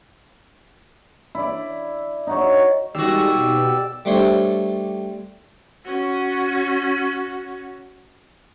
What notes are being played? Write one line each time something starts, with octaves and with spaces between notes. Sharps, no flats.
E4 D5
D#4 F#4 C#5
D#2 G3 G#3 F#4 G4 D5 E6
B2
G3 A3 D4 C5 C#5
C#4 F#4